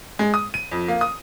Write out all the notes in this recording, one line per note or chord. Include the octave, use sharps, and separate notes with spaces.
G#3
D#6
D#7
F2
A#3
D#6